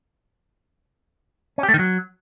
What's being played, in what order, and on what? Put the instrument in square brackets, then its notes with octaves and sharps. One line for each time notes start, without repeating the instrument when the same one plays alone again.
[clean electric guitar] C#4
G4
A3
D#3
F#3